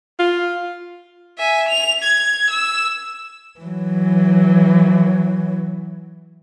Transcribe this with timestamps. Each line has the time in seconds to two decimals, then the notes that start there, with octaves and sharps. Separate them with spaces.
0.19 F4
1.38 E5 G#5
1.69 F7
2.03 G#6
2.50 E6
3.60 E3 F#3